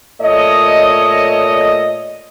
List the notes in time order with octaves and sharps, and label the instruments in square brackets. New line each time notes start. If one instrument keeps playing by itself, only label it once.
[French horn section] A#2 A3 C#5 D#5